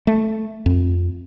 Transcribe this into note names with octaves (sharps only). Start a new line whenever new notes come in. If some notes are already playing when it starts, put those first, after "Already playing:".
A3
F2